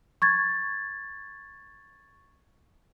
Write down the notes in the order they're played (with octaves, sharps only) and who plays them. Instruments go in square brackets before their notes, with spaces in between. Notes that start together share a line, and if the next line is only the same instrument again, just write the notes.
[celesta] C#6 G#6 A6